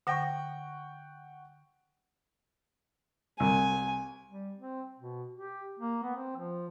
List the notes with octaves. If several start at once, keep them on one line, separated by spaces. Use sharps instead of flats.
D3 F#5 G5 C#6 A#6
C2 G#5
G3
C4
B2
G4
A#3
B3
C4
F3